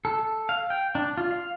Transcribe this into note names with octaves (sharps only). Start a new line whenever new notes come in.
A4
F5
G5
D4
F4
F5